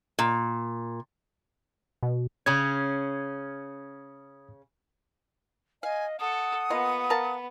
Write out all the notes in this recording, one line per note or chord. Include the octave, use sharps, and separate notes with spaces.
A#2
B2
C#3 C#4 D#6 G#6
D#5 F5 G#5
A4 F#5 D#6
A#3 B3 F4 D#5
A#4 F5 A5